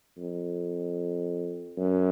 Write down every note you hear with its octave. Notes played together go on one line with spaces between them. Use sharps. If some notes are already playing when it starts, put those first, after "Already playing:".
F2
F#2